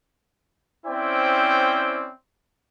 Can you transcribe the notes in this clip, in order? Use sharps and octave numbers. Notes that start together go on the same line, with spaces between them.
C4 C#4 E4 C5 D5 G5